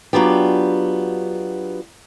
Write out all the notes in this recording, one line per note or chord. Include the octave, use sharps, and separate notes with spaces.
F#3 G3 B3 D4 F4 G4